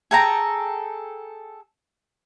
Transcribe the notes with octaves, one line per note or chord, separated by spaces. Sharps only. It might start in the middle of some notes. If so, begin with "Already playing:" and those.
G#4 A4 G5 A#5